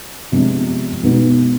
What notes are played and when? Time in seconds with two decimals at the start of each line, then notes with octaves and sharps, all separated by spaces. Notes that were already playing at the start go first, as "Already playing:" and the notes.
0.32 C3 F3 G#3 B3 D4
1.03 B2 G#3 B3 D#4